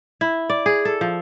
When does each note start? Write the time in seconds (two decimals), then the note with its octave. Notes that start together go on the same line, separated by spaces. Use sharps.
0.21 E4
0.50 D5
0.66 G#4
0.85 A4
1.01 F3